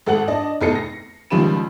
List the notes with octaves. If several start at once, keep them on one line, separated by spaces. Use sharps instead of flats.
G#1 A4 F#5 F#7
D4 D#5 A5
F1 E2 D#4 A4 C7 C#7
A#6
C#2 D#3 F3 G3 B5 E7